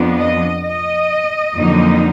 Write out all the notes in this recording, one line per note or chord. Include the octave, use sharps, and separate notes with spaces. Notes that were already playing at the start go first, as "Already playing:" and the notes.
Already playing: F2 F3 B3 D4
D#5
D#5
F2 D3 F#3 A#3 D#4